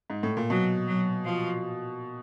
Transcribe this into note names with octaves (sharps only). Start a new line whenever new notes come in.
G#2
A2
A#2
B2 F#3
F#3
F3